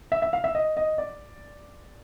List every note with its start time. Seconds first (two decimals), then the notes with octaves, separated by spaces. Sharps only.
0.12 E5
0.22 E5
0.33 F5
0.44 E5
0.55 D#5
0.77 D#5
0.98 D5